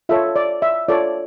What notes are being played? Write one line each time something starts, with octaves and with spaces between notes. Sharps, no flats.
F4 A4 C#5 E5
D5
E5
F4 A4 C#5 D5